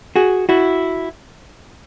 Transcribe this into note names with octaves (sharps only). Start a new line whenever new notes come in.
F#4 G#4
E4 F#4